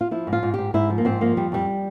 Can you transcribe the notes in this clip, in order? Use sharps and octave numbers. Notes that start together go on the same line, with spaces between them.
F4
F3 E4
G#2
F4
G#2
G#2 G4
G#2 E4
F3
A#3
G#2 C4
F3 A#3
F2 G3
F2 G3